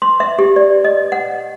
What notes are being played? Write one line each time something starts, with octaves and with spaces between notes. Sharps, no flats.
C6
E5
G4
D5
D#5
F#5